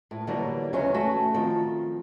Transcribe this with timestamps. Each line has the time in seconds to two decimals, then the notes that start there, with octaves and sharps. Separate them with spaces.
0.11 A2
0.27 B2 D3 E3 F#3 G3 A#3
0.73 E2 C#3 F#3 C#4 D#4 G#5
0.94 A3 F#4
1.34 D#3 F3 C4